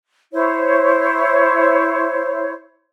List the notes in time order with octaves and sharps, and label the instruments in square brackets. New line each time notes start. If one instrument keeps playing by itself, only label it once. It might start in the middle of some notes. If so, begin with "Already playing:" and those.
[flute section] E4 C5 C#5